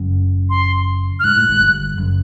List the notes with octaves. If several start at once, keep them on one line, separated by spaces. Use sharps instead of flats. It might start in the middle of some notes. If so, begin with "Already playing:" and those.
Already playing: F#1 F#2
C6
F6
G#2 F#6
A2
G#1 G#2
G1 G2
F#1 F#2